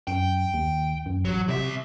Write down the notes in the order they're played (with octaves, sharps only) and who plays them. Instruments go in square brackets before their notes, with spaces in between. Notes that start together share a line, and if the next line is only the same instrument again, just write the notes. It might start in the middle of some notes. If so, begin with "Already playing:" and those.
[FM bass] F#2 [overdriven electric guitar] G5
[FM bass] D#2
F#2
[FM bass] A1 [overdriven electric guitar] F#3
[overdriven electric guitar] C2 E5 [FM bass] C3